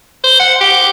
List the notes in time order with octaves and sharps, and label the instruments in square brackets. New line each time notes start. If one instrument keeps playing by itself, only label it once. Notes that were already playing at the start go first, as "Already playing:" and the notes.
[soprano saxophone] C5
F#5
G4